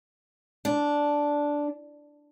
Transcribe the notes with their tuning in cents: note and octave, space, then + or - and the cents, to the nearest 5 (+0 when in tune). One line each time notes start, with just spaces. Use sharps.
D4 -5